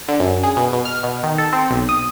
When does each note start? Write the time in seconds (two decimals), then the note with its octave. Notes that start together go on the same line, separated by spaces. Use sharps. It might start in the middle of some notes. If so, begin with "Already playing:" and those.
0.08 D3
0.20 F#2
0.43 G#4
0.57 B2
0.73 B2
0.85 F6
1.03 B2
1.23 D#3
1.38 A4
1.53 C4
1.70 B1
1.89 D#6